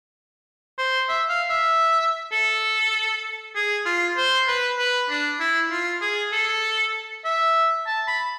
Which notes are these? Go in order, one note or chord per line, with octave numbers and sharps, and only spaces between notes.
C5
E5
F5
E5
A4
G#4
F4
C5
B4
B4
D4
E4
F4
G#4
A4
E5
A5
B5